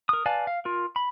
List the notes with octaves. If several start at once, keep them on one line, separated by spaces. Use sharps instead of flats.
A#4 D#6
B4 D5 F5 G#5 A5
F5
F4 A#4
B5